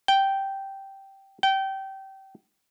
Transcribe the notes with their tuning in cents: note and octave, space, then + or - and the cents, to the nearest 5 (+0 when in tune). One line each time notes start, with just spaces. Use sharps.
G5 -10
G5 -25